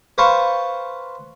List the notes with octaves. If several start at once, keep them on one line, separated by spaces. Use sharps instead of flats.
B4 C5 F5 A5 C#6